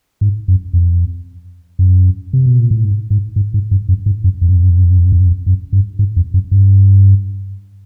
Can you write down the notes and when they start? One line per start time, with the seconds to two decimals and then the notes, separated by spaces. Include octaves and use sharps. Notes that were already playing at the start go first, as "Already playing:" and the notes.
0.21 G#2
0.48 F#2
0.73 F2
1.79 F#2
2.33 C3
2.46 B2
2.59 A#2
2.71 A2
2.84 G#2
3.10 G#2
3.36 G#2
3.54 G#2
3.71 G2
3.89 F#2
4.06 G#2
4.24 F#2
4.41 F2
4.48 F#2
4.56 F2
4.63 F#2
4.69 F2
4.77 F#2
4.84 F2
4.91 F#2
4.98 F2
5.05 F#2
5.12 F2
5.20 F#2
5.26 F2
5.46 F#2
5.73 G2
5.99 G#2
6.16 F2
6.34 F#2
6.51 G2